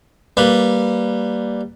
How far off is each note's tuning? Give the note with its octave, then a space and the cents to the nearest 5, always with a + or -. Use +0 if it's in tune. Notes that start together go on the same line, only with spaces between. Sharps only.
G3 +0 A#3 +0 B4 +0